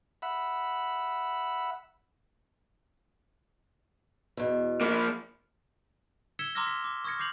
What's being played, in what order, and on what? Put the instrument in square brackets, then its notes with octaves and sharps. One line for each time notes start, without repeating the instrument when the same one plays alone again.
[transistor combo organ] E5 F#5 B5
[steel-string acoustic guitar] E2 B2
[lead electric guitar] F3 A#3
[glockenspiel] E6 G#6 B6 C#7 E7 G7
A#5 C6 D6 E6 F6 A#6
B6
D6
C#6 D#6 F6 G#6 A#6 C#7
D6 G6 C7 F7 F#7